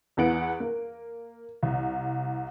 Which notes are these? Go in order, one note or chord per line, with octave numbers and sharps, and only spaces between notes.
E2 E3 B3 F#5 D7
A#3
C2